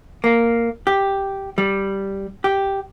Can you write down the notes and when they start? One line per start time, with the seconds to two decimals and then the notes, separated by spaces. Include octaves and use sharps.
0.24 A#3
0.87 G4
1.58 G3
2.44 G4